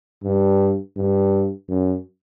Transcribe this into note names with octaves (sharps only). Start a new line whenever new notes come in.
G2
G2
F#2